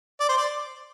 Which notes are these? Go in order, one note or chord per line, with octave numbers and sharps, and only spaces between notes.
D5
C5
D5